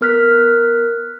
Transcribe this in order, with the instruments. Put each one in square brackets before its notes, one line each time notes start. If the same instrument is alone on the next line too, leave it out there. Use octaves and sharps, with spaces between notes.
[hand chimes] B3 A#4 F6 F#6 B6